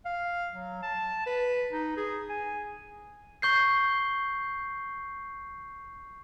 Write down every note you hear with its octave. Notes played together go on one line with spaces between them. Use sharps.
F5
F#3
A5
B4
D#4
G#4
G#5
C#6 G6 C7